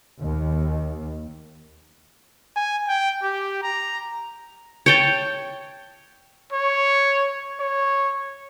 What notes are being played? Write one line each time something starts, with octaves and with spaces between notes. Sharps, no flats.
D#2
G#5
G5
G4
A#5
C#5 G5 A5
C#5
C#5